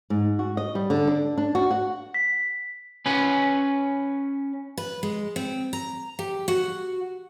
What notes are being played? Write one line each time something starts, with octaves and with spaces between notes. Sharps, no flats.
G#2
F#4
D#5
G3
D3
D4
D4
F#4
F#5
B6
C#4 B4
B4
G#3
C4
A#5
G4
F#4